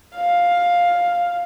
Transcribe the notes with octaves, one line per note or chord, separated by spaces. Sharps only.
F5